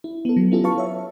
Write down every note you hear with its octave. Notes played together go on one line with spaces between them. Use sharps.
E4
B3 A4
F#3
B3 C#4 E4 F4 G4 A4
B4 F5 A5 C#6
C#5 E5